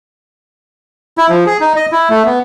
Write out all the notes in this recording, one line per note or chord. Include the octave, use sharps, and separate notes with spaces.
E4
F3
G#4
D#4
D#5
E4
A3
B3